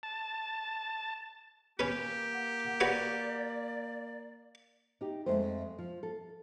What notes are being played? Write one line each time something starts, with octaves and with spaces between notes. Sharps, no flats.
A5
A#3 C#4 G4 B4
F#5
F#4 B4 C#5 D5
D#4 G4
F2 G#3 A3 C5
F3
A4